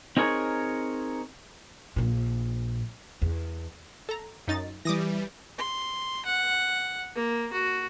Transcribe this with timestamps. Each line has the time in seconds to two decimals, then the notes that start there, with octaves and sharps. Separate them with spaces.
0.17 C4 D#4 G#4 A#4 C#5
1.96 A#1 A#2
3.22 E2
4.09 A4 A#5
4.48 F#2 D#4 A6
4.85 E3 G3 D6 D#6 A#6
5.58 C6
6.25 F#5
7.15 A#3
7.52 F#4